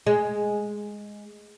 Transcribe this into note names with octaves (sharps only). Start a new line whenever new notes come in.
G#3